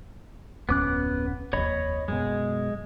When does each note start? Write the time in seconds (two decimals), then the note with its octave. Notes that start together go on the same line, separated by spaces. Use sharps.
0.69 D1 F2 B3 C#4 D6 F#6
1.53 F1 D#2 C#5 D#5 B5
2.08 F#2 B2 G#3